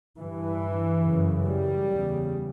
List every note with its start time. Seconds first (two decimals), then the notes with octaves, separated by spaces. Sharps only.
0.20 G2 E3
1.03 F#2 C#3
1.44 G3
1.86 E2 C#3